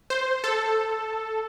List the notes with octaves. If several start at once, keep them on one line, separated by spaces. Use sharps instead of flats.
C5
A4